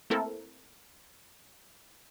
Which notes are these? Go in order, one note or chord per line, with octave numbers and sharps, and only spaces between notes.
A3 A#3 C4 E4 A4 A#4